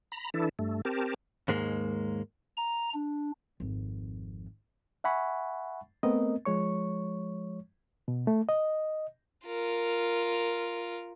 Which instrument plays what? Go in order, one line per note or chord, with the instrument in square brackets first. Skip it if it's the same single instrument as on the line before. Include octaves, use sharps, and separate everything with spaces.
[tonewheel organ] A#5 B5
E3 D4 E4 A4
G2 A3
C4 G4 A#4 A5
[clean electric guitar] D#2 G#2 G#3 A#3
[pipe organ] A#5
D4
[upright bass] G#1 F2
[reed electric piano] E5 F#5 G#5 B5 C#6
A3 B3 C4 A#4 D#5
F3 G#3 C#5 C#6
B2
A3
D#5
[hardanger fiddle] F4 A#4